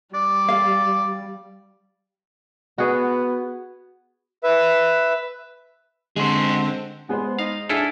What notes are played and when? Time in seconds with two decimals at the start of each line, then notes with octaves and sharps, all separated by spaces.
0.15 G3 D5
0.49 F5
2.78 B3 F#4 G#4
4.43 B4 E5
6.17 D3 G#3 C4 F#4 G#4 C6
7.09 G#3 B3 G#4 C5
7.39 D#4 F5
7.69 D4 E4 F4 G#4 A4 F#5